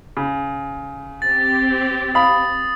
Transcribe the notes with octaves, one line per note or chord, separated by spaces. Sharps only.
C#3
C4 G4 A6
F5 B5 D#6